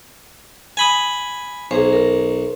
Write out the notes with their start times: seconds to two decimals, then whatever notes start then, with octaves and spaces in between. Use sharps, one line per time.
0.77 G#5 B5 D#6
1.71 B1 G#4 C5
1.93 A#4